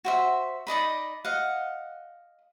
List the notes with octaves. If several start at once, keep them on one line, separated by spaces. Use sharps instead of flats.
F#4 C5 E5
D#4 D5 D#5 B5
D#5 F5 F#5